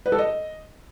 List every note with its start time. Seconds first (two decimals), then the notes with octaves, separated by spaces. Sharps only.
0.06 B4
0.12 A4
0.19 D#5